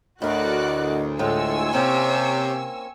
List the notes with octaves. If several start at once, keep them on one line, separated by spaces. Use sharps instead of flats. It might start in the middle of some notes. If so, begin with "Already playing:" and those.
D2 A2 F#4 A#4 D5 D#5 F#6
A2 G#3 F4 A4 G#5 C#6 E6
C3 A#3 C4 C#4 C#5